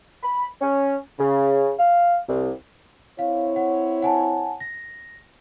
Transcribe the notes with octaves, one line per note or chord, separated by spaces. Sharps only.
B5
C#4
C#3
F5
C2
C4 E4 C#5 F5
F#5
F#5 G#5 A5
A#6